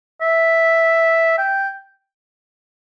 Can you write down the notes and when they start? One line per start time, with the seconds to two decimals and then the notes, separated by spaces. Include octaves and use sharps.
0.21 E5
1.38 G5